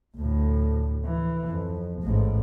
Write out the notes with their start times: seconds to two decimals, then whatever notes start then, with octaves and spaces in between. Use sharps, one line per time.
0.16 D2 A2
1.05 E3
1.48 F2
2.03 A1 G#2